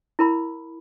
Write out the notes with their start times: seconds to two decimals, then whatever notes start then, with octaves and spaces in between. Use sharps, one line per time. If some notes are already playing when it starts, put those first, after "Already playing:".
0.19 E4 A#4 B5